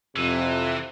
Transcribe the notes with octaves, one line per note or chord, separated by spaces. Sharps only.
F2 C3 E3